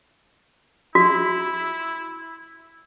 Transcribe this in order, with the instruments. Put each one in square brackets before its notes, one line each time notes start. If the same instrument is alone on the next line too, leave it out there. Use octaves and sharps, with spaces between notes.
[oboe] E4 [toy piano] F#4